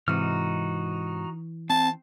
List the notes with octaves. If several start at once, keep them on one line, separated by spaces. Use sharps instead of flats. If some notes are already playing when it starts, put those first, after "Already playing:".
G#2 C3 E3 D#4 F#4 F6
C4 A5